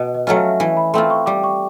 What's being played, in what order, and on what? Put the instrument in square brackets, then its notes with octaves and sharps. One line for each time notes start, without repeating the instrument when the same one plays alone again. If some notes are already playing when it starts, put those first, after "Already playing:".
Already playing: [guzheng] B2 [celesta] D#5
[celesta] D#5
[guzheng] F#3 A3 C#4 F4
[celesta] E5
[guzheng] E3
[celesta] B5
[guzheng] A3 C4 F4 [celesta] C6
[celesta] C#6
[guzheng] G3 [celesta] D6
[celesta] C#6